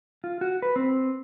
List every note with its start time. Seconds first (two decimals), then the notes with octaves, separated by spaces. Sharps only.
0.24 F4
0.41 F#4
0.62 B4
0.76 C4